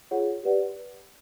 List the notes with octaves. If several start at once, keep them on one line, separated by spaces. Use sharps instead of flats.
F4 G#4 C#5 F#5
G4 B4 D5 F#5